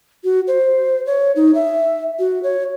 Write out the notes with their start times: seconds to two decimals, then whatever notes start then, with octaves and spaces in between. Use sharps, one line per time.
0.24 F#4
0.47 C5
1.06 C#5
1.36 D#4
1.55 E5
2.19 F#4
2.43 C#5